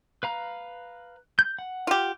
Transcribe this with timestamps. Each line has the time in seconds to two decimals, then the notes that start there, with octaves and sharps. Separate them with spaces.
0.23 B4 F5 A#5
1.39 G6
1.59 F#5
1.87 F4 G4